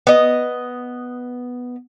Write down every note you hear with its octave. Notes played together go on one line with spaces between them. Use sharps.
B3 D#5